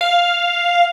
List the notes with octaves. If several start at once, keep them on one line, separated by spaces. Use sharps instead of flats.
F5